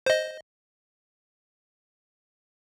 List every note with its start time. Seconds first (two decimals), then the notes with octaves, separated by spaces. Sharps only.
0.06 C5 D#5